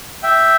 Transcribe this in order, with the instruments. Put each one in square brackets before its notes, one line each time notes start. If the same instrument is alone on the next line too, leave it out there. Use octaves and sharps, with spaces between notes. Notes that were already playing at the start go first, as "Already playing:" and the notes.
[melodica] E5 G5